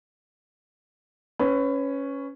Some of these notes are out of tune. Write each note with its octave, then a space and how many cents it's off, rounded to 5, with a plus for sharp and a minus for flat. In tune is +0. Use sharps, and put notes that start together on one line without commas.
C#4 +0 B4 +20